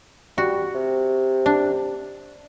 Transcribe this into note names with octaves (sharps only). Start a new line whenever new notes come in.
G3 F#4
C3
D4